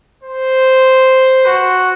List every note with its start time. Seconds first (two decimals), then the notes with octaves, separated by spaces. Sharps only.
0.23 C5
1.46 F#4